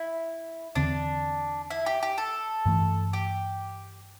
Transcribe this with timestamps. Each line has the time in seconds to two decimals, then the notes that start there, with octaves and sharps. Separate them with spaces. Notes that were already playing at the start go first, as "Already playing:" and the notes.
Already playing: E4
0.75 E2 D3 C4 D4
1.70 E4
1.86 G4
2.03 G4
2.18 A4
2.66 G2 E3 A3
3.13 G4